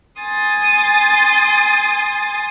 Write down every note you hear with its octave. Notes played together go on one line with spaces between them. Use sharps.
G#5 C6 D#6 A6